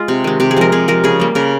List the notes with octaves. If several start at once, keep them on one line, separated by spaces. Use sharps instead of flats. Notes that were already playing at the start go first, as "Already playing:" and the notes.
Already playing: G#3 F4
C3
D#3 G#3
C3 G4
G#4
F3 G#3 A#4
C3 G#4
F3 G#3 A#4
C#3 G#4
G3 A#3
C#3 A#4